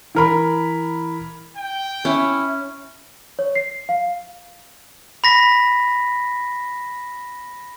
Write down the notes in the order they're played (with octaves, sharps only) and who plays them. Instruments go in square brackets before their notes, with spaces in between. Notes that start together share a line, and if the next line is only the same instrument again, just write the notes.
[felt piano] E3 A#4 B5
[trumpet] G5
[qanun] C#4 [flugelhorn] E4
[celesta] C#5
C7
F5
[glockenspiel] B5 A#6 B6